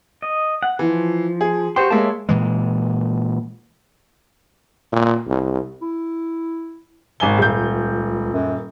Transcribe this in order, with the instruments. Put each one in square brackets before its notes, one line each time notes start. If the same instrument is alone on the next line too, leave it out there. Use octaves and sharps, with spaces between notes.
[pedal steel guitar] D#5
F#5
[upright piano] E3 [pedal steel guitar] F3
[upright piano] G#4
[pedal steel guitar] F#4 C5 C6 [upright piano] G4
[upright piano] G#3 A#3 [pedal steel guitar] C#5 E5 A5
[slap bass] A#2 E3 G#3
[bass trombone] A#2
C2
[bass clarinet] E4
[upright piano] G#1 G#5 G7 [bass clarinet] B2
[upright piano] D#1 G6 [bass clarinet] C#2
[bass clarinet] F#2